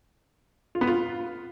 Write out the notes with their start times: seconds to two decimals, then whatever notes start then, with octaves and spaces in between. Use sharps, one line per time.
0.75 F4
0.81 B3
0.87 F4